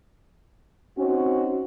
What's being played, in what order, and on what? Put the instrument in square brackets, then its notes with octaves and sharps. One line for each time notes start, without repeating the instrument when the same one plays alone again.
[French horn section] C4 C#4 D#4 F#4